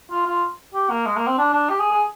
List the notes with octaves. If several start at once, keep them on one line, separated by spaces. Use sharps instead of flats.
F4
F4
G4
A#3
G#3
A#3
C4
D4
D4
G4
G#4
G#4